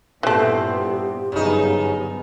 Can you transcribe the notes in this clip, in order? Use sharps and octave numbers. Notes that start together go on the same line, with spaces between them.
G2 A#2 E3 A3 B3 C4 G4
G1 F#2 C#3 B3 D#4